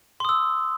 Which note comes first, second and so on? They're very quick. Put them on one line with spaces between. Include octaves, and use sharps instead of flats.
C6 D#6 E6